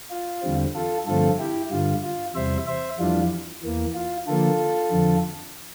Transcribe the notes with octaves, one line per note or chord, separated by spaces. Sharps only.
F4
E2 D3 G3 C4
F4 A4
G2 D3 F3 A3 C4 F4 A4
E4 G4
G2 D3 G3 F4
F4
E2 C3 G3 C5 E5
C5 E5
F2 E3 G3 D4 F4
E2 E3 A#3
F4
D3 F3 A#3 F4 A4
F2 D3 F3